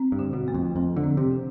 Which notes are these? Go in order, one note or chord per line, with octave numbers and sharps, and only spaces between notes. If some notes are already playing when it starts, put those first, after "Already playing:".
Already playing: C4
G2
D3
B2
A3
F2
F2 F3
D3
C4
C3
D3